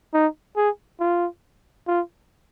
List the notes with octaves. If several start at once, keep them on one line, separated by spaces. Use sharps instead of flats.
D#4
G#4
F4
F4